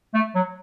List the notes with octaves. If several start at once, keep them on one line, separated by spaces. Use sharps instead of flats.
A3
F#3